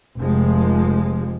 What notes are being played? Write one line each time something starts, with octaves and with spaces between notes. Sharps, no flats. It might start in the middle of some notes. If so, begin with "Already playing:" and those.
F1 C3 F3 G#3